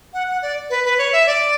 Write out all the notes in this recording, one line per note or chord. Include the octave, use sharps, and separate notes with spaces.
F#5
F#5
D5
B4
B4
C#5
E5
D5